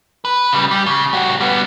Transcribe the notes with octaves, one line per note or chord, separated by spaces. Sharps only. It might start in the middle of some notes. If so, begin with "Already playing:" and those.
B4
C#3 G3
G3
C#3
G3 F#4
G3 B3